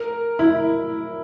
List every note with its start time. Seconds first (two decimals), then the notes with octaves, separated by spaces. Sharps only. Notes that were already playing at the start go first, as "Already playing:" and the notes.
Already playing: A#4
0.39 E4